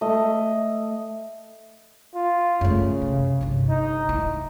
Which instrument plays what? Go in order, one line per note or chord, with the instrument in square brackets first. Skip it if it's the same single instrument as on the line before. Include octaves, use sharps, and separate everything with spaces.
[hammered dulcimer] A3 D#5
[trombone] F4
[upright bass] F#2 A3 [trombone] C#3
[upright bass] C3
G1 C3
[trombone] D#4
[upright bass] E4